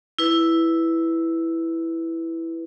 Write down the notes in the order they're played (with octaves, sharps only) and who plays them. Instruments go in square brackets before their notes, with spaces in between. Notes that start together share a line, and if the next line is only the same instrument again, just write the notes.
[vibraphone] E4 B4